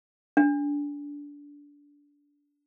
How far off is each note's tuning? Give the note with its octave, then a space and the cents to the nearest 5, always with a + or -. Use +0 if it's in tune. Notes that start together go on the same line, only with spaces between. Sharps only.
D4 -20